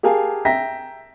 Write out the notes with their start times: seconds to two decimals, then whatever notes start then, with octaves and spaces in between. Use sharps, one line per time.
0.03 G4 G#4 A#4 F5 G#5 A5
0.45 E5 G5 A#5 A#6 B6